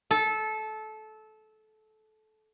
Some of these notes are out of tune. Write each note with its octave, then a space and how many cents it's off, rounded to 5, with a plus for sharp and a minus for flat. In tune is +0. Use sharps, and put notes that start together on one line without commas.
A4 -20